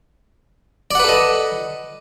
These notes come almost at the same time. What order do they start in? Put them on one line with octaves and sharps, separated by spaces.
D5 F#5 B4 A4 D#5